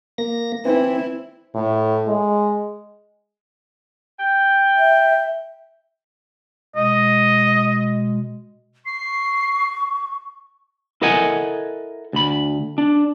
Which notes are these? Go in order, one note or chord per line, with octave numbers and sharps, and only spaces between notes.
A#3 A#6
E3 C4 E4
A2
G#3
G5
E5
B2 G#3 D#5
C#6 C7
E4 A4 A#4 D#5 F#5 G#5
D2 B5
D4